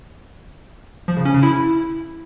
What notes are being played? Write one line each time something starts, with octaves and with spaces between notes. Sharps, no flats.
F3
C#3
C#4
C#3
E4